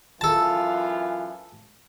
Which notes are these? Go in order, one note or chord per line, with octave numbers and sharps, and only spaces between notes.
F#2 E3 F4 A4 A5